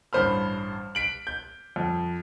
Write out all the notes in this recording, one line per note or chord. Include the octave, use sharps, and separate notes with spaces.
A1 G2 C5 B5 F6
B6 D7 F#7
G6
F2